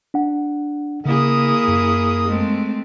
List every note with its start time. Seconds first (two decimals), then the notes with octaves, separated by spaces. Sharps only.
0.14 D4 F#5
1.06 C#3 A#3 E4 G#4 D#6
1.68 F#2
2.27 G#3 A3 C4